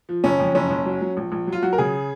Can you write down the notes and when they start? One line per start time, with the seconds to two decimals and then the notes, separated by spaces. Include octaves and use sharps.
0.09 F3
0.24 F#1 C#4
0.40 F2
0.55 F#1 C#4
0.71 F#1
0.86 F#3
1.01 F#3
1.17 A#1
1.32 A#1
1.47 F#3
1.52 F4
1.63 F#3 F#4
1.73 A#4
1.78 C#3 G#4